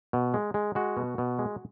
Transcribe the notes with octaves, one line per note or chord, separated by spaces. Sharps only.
B2
G#3
G#3
G#3 F#4
B2
B2
G#3